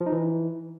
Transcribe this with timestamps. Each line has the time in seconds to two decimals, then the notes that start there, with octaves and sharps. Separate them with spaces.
0.01 F3
0.06 D#4
0.12 E3